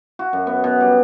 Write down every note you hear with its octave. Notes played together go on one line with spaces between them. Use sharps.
F#4
F#2
B3
B2
G3